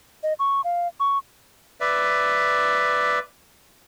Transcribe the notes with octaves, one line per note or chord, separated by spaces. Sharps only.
D#5
C#6
F5
C#6
B4 D5 E5